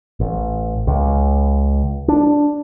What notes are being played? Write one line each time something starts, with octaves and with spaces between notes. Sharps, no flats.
A1
C#2
D4